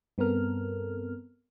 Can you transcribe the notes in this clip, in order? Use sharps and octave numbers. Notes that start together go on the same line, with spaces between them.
G2 B3 C4 A4 A#4 F6